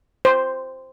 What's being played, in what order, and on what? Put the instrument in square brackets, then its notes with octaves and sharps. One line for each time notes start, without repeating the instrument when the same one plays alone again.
[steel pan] C5